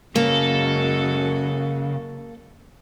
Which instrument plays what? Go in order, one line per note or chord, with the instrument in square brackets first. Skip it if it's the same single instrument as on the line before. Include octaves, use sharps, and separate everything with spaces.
[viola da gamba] F#2 G#3 F#4 [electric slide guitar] C#3 [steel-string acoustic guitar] A#3 [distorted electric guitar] A4